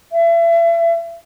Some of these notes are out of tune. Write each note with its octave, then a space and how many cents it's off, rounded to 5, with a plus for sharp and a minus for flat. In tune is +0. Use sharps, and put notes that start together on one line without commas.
E5 +35